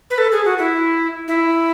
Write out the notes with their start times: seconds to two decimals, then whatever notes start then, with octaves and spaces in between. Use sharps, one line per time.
0.10 B4
0.18 A4
0.32 G#4
0.45 F#4
0.58 E4
1.28 E4